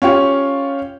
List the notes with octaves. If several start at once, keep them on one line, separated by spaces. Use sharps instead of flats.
C#4 F4 G4 C#5